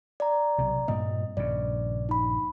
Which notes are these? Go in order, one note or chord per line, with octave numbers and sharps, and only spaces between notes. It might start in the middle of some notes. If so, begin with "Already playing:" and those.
D5 A#5
B1 C3
G2 A#2 C4 D#5
A#1 G2 C#3 D5
D#4 B5